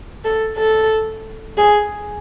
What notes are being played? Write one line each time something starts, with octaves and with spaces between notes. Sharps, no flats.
A4
A4
G#4